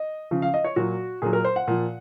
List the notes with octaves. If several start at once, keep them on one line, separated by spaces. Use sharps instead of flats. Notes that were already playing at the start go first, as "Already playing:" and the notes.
Already playing: D#5
C#3 F3
F5
D#5
C#5
A#2 F#3 F#4
A#2 F#3 G#4
A#4
C5
F#5
A#2 F3